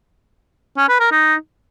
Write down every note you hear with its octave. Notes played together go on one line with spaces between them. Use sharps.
C#4
B4
A#4
D#4